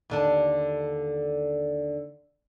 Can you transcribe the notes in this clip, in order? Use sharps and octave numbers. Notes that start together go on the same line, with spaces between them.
D#2 D3 D4